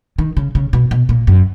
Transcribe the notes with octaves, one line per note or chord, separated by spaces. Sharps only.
D#3
C#3
C#3
B2
B2
A#2
F#2